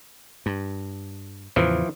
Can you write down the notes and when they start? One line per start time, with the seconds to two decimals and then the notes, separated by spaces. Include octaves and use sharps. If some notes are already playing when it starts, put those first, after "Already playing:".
0.46 G2
1.56 E2 A2 C#3 E3 F3